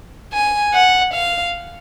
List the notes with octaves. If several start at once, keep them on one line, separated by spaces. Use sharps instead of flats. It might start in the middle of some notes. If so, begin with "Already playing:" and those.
G#5
F#5
F5